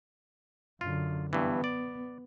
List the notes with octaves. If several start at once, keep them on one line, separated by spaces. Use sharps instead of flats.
F#2 D3 F4
G2 E3 B3
D5